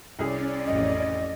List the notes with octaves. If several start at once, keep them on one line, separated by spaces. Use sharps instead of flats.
C2 C#4 G#4 D5
A1 F2 D#5